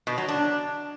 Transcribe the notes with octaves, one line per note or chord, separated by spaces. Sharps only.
B2
F#3
D4